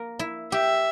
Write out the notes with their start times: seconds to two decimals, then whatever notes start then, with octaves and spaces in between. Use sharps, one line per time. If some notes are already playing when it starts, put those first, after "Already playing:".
Already playing: A#3 A#4
0.19 E4
0.52 G4 E5